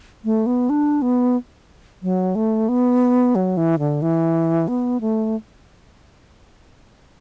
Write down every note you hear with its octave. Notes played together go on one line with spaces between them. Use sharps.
A3
B3
D4
B3
F#3
A3
B3
F#3
E3
D3
E3
B3
A3